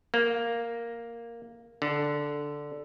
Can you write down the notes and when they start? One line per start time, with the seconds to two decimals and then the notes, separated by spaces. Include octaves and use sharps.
0.14 A#3
1.82 D3